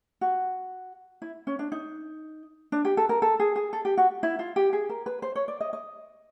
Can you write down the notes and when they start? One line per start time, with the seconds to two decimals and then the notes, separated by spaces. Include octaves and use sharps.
0.21 F#4
1.22 E4
1.47 C#4
1.59 D4
1.72 D#4
2.72 D4
2.85 G4
2.97 A4
3.09 A#4
3.22 A4
3.40 G#4
3.56 G#4
3.73 A4
3.85 G4
3.97 F#4
4.23 E4
4.39 F4
4.56 G4
4.73 G#4
4.89 A#4
5.06 B4
5.22 C5
5.36 C#5
5.48 D5
5.60 D#5
5.73 D#5